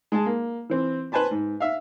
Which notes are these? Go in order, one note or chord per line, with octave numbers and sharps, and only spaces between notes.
G#3 G#4 A5
A#3
E3 C4
B4 C5 G#5 A5 B5
G#2
E5 F5